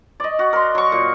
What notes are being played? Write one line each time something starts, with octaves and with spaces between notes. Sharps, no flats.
D5 D#5
F#4
A#4 C6
F#3 C#6
A#2